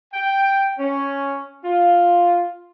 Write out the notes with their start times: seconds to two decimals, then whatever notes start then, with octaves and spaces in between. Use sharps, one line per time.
0.14 G5
0.79 C#4
1.65 F4